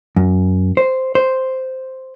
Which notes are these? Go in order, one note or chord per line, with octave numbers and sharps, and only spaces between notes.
F#2
C5
C5